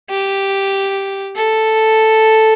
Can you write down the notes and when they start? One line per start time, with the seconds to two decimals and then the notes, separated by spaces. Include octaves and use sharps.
0.10 G4
1.36 A4